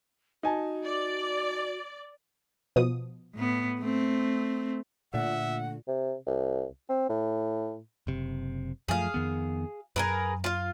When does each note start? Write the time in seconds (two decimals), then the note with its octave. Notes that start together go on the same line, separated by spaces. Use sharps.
0.43 D#4 F#4 G#5 A5
0.84 D5
2.76 B2 F3 D#6
3.35 A2 B3
3.80 A3 C4
5.14 A#2 D3 A3 E5 F#5
5.88 C3
6.27 C2
6.89 C4
7.09 A2
8.07 F#1 C3
8.88 F#2 F3 A3 G#4 F5
9.14 F2 D#3 B3
9.96 F#2 G#4 A#4 B4
10.44 F4 F5